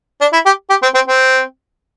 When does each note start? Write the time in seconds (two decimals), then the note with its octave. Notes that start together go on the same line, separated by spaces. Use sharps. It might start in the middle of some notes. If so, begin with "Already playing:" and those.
0.21 D4
0.33 E4
0.46 G4
0.70 G4
0.83 C4
0.95 C4
1.08 C4